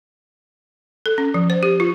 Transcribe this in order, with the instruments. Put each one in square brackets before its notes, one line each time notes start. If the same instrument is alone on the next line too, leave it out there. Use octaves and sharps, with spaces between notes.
[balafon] A4
C#4
F3
C5
G4
F4